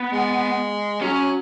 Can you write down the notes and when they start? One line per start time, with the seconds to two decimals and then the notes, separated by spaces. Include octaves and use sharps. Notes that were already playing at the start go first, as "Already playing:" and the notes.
Already playing: B3
0.13 G#3
1.01 F#3 C#4